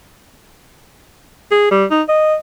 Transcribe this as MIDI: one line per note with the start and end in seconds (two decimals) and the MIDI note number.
1.51 1.70 68
1.71 1.85 55
1.91 2.02 63
2.08 2.35 75